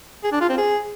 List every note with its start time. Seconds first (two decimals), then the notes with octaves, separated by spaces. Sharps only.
0.24 G#4
0.32 D4
0.40 F4
0.49 C4
0.57 G#4